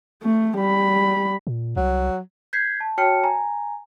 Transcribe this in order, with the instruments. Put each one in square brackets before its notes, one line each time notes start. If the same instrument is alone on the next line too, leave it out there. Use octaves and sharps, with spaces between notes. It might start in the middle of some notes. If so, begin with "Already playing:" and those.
[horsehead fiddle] A3
G3 B5
[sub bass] A#2
[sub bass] C2 [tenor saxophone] F#3
[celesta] G6 G#6 B6 C7
A5
F#4 C#5 G5 A5 F6 C#7
G#5 A#5